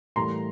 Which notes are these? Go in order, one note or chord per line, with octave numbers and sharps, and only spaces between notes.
A2 E3 G3 A#3 A#5 C6